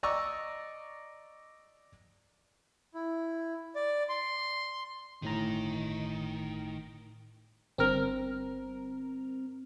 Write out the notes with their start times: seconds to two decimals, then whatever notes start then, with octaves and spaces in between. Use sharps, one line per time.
0.03 D5 D#5 A#5 C#6 D6 E6
2.94 E4
3.75 D5
4.09 C6
5.22 G1 A2 D#3 A#5
7.78 G1 C4 A#4